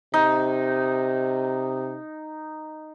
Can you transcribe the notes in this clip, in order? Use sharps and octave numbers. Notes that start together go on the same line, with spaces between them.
C3 D#4